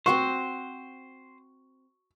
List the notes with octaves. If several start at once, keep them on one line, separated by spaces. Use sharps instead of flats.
C4 F#4 C5 F#5 C#6